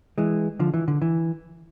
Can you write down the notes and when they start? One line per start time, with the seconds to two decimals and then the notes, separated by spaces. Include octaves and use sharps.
0.18 E3 G#3
0.59 D3 F3
0.74 E3
0.88 D3
1.02 E3